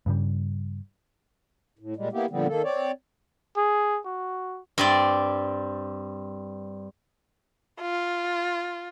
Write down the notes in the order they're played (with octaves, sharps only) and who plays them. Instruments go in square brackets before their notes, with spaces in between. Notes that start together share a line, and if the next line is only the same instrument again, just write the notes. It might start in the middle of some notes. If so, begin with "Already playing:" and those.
[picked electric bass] G2 C#3 G3
[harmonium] A2
A#2 G3 G#3
A#3 B3 E4 G4
A#2 D3 F3 G3 B3 C4
D#3 A#3 A4
C4 C#5 D5
[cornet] G#4
F#4
[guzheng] G2 C4 D5
[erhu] F4